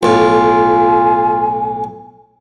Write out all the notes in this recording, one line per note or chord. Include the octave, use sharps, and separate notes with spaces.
B1 A2 F4 G#5